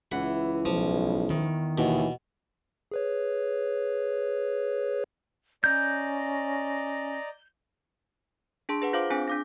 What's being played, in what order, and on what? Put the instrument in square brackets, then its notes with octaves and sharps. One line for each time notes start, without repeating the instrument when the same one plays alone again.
[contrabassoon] C#2 [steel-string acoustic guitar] E3 [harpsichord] F#5
[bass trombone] B1 [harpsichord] F3
[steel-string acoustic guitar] E2 D#3
[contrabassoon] D#2 [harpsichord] B2 [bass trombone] E3
[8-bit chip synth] G#4 B4 C#5
[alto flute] C#4 [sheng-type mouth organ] D5 D#5 A#5 [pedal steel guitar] G6
[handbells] D4 G#4 A5 C6
G#4 B4 F#5
F4 C5 F5 D6
C4 D4 G#4 G#5
D4 D6 A#6